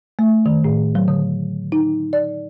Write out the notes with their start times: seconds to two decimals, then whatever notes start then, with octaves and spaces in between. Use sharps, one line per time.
0.19 A3
0.46 D#3
0.64 A2
0.95 F#3
1.08 D3
1.72 D#4
2.13 D5